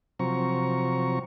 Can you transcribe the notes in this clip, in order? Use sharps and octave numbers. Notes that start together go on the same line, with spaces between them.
C3 F3 F#3 C4 A#5 C#6